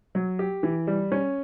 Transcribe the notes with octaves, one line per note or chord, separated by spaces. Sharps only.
F#3
G4
E3
G3
C#4